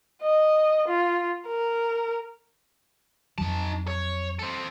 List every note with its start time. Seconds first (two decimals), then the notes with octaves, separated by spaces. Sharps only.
0.22 D#5
0.87 F4
1.47 A#4
3.38 F2 F#3 D#4 A5
3.88 C#5
4.39 C4 A4